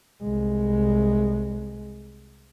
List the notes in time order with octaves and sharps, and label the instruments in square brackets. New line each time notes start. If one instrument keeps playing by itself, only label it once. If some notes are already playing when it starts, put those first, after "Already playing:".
[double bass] C2 G#3